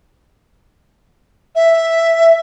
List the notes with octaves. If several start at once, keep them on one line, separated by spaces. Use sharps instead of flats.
E5